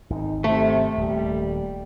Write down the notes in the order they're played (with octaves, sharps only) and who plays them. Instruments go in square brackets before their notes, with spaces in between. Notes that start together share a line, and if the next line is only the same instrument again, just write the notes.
[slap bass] G#1 [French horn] D#4
[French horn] C3 [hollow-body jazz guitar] A3
[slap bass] D#1 [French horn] G3